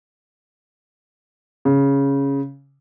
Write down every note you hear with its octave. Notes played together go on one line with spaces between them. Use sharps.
C#3